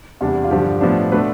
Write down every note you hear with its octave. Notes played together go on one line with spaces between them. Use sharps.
E2 C3 G3 D4
F4
G2 D3 F3 G4
A2 F3 B3 D4
B2 A3 D4 B4